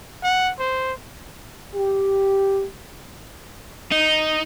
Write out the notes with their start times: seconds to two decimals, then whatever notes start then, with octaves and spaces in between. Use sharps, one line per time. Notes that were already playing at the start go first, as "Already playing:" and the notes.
0.24 F#5
0.59 C5
1.76 G4
3.92 D#4